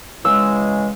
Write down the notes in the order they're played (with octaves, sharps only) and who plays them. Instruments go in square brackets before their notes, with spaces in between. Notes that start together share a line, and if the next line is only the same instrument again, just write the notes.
[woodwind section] C#3 E3 G#3 [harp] E6